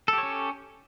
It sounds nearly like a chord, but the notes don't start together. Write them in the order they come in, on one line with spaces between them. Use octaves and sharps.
A4 G4 C#5 C#4